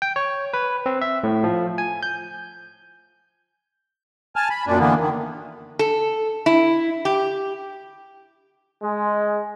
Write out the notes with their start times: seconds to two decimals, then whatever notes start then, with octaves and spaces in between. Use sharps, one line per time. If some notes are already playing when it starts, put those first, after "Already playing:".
0.02 G5
0.16 C#5
0.54 B4
0.86 C4
1.02 E5
1.24 A2
1.44 F3
1.78 G#5
2.03 G6
4.36 G#5 A5 F6
4.50 B5
4.67 F#2 A#2 D4
4.79 D3 E3 A#3 B3
4.99 D#3
5.79 A4
6.46 E4
7.05 G4
8.83 G#3